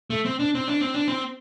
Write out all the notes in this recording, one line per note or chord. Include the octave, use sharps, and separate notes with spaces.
A3
C4
D4
C4
D4
C4
D4
C4